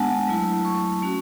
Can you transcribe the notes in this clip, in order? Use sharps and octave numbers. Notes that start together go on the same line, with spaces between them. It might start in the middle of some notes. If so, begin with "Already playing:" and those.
Already playing: G#3 B3 D4 F#5 G#5 A5
F#3 A3 E4
C#6
A3 C#4 F#4